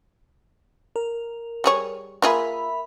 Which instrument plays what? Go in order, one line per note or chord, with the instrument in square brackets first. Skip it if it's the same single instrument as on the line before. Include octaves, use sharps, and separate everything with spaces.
[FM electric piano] A#4
[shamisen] G3 G#4 C#5
[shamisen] A#3 F4 G#4 [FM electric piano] A#4 E5 B5